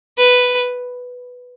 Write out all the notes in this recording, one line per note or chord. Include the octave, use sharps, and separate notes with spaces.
B4